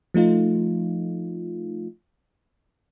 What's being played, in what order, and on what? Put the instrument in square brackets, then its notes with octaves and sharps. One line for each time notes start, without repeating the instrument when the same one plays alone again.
[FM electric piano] F3 A3 D#4 F4